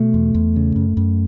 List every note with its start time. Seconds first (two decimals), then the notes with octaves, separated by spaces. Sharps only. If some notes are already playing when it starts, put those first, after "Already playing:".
Already playing: B2 A3
0.14 E2
0.35 E2
0.56 C#3
0.76 F#2
0.97 F#2